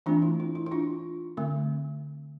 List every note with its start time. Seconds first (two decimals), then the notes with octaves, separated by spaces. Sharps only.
0.06 E3 A3 C4 D4 F4
0.22 E4
0.40 E4
0.55 E4
0.66 E4
0.72 D4 F4
1.37 D3 A3 C4